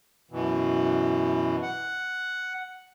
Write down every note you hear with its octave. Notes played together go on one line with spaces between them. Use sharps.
F#2 B2 E3
F#5